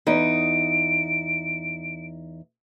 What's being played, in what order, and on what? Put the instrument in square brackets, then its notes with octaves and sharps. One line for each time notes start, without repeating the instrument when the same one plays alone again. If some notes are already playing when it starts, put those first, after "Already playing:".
[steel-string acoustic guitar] E2 D#4 [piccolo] D7